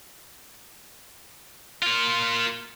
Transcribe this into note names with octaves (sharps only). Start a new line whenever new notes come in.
A#3 F4